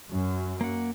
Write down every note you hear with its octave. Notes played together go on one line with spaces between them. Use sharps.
F#2
A#3 F#5